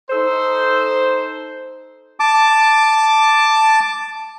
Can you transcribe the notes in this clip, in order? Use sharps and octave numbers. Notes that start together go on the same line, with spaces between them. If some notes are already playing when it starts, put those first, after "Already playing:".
D#4 A4 C5
A5 D6